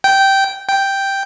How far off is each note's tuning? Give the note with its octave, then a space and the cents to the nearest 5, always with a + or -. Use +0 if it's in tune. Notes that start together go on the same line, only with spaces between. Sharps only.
G5 -10
G5 +0